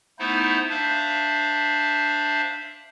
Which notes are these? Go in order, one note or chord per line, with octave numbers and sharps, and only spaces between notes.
A3 B3 D#4 E4 C5
D4 C5 E5 F5